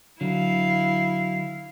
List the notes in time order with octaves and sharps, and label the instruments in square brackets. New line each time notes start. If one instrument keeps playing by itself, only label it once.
[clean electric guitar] D3 F#3 [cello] E4 F5